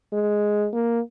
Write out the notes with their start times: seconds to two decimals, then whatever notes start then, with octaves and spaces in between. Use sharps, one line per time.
0.13 G#3
0.73 A#3